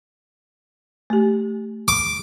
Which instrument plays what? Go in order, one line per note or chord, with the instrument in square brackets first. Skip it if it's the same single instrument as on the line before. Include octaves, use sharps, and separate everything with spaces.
[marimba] A3 G4
[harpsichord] D6